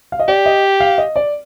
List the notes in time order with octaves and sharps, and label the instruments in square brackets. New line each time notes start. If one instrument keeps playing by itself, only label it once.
[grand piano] F5
D#5
[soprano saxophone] G4 [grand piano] D5
[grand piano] D#5
F5
D#5
D5